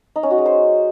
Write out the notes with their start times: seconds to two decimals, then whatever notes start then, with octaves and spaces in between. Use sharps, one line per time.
0.16 D#4
0.23 C#4
0.31 F#4
0.38 G#3
0.46 C5